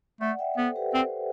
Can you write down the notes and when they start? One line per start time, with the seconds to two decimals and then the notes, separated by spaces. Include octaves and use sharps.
0.21 A3 D5 F#5
0.39 E5 G5
0.57 B3 A4 C5
0.76 G4 B4
0.94 C4 A4 C5